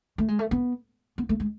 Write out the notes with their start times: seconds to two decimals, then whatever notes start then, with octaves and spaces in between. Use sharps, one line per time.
0.18 A3
0.28 G#3
0.39 A3
0.51 B3
1.18 B3
1.29 A3
1.40 G#3